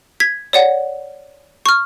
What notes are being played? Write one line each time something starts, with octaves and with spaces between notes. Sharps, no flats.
G#6 B6
C#5 D5 F#5
C#6 F6